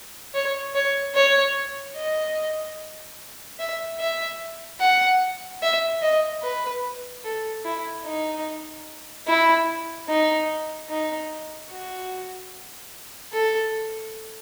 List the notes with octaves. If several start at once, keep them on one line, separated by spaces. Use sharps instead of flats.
C#5
C#5
C#5
D#5
E5
E5
F#5
E5
D#5
B4
A4
E4
D#4
E4
D#4
D#4
F#4
A4